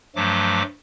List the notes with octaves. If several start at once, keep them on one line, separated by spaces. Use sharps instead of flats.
G2 F3 F#3 A3 D6